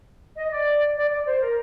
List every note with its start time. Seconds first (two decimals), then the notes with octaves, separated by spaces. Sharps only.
0.36 D#5
0.51 D5
0.96 D5
1.11 D5
1.26 C5
1.42 A#4